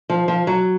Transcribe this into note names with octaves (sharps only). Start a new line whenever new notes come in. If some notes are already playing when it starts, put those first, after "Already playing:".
F3
F3
F#3